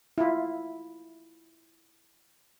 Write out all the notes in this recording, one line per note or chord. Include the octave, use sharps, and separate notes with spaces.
E4 F4